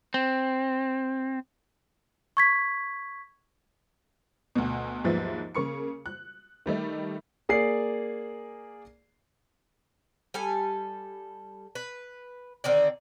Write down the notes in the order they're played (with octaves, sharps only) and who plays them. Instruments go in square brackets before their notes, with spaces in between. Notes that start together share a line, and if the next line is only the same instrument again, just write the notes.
[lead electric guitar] C4
[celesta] C#6 G#6 B6
[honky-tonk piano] D2 B2
D#2 G#2 F3 F#3 B3 E5
C#3 A#3 C#6 C#7
F#6
D#3 G3 A3 D#4
[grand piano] A#3 G#4 D5 C7
[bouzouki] G3 A4 G#5
B4
D3 D#3 C4 D5